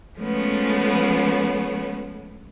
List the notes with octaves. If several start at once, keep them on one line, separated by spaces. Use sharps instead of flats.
F3 G#3 A3 B3 C#4